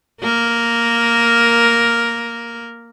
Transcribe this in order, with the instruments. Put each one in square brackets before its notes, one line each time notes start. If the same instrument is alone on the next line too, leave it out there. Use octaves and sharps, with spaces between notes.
[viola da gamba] A#3 A#4